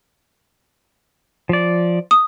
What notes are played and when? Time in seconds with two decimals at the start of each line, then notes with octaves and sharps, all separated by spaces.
1.49 F3 D5
2.11 D#6